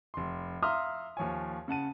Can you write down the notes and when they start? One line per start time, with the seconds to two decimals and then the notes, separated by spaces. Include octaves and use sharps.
0.14 F1 C6
0.63 E5 F5 A#5 C6 D#6 F6
1.17 D#2 F3 C#5 G#5
1.68 C#3 F#5 A5 D#7